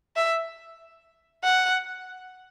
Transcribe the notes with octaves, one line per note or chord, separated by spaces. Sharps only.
E5
F#5